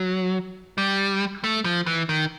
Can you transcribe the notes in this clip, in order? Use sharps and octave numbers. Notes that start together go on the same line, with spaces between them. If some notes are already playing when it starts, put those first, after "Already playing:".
Already playing: F#3
G3
A3
F3
E3
D#3